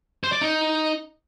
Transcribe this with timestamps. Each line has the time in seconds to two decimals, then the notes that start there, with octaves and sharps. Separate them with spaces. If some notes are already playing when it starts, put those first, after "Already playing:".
0.24 C5
0.33 D5
0.41 D#4